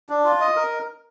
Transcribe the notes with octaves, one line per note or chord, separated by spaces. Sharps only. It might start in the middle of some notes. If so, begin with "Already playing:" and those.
D4
F4
D#5
A#4